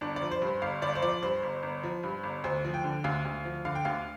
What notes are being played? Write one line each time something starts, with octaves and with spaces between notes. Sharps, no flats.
G1 D4
D5
F3
C5
G2
C5
G1 F5
G1 D5
C5
F3 D5
G2 C5
G1
G1
F3
G2
G1
D2 C5
F3
G5
D3
D2 F5
D2
F3
D3 F5
G5
D2 F5